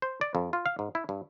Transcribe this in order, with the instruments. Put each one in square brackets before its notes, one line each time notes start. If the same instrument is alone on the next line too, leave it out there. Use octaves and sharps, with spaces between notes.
[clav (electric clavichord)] C5
D5
F2
F4
F5
G#2
E4
G2